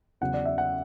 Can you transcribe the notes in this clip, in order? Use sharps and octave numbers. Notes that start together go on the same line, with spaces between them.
E2 C#3 F#3 F#5
D5
E5
F#5